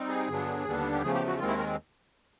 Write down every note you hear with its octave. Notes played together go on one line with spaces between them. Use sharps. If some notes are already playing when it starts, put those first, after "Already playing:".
Already playing: G3 C4 D#4
G#4
G2 D3 F#3 B3 D4
D#2 D3 G3 B3 D4
G4
E2 C#3 F3 A3 G#4
G4
F#4
D#2 D#3 G#3 C4 F4
E4
A#4